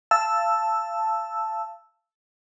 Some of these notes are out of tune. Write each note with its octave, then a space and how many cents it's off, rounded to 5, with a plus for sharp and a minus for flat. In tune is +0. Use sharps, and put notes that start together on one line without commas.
F5 -30 A5 +0 E6 +0